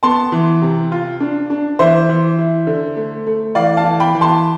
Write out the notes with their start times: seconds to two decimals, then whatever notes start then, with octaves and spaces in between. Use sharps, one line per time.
0.03 B3 A5 C6
0.32 E3
0.62 C3
0.92 F4
1.20 D4
1.50 D4
1.79 E3 C5 E5
2.09 E3
2.39 E4
2.67 D3
2.96 A3
3.27 A3
3.55 E3 D5 F5
3.77 F5 A5
3.85 E3
4.00 G5 B5
4.15 E3
4.21 A5 C6